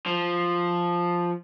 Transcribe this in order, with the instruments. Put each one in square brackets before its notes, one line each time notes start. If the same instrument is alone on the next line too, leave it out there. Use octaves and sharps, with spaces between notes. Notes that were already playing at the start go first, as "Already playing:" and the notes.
[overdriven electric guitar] F3